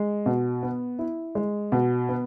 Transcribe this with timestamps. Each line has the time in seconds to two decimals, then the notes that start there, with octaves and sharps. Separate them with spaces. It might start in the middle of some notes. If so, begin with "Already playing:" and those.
Already playing: G#3
0.26 B2
0.63 B3
0.99 E4
1.35 G#3
1.72 B2
2.09 B3